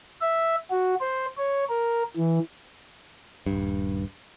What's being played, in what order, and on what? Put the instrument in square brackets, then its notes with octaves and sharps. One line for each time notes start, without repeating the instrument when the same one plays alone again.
[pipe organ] E5
F#4
C5
C#5
A#4
E3
[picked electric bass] D#1 G2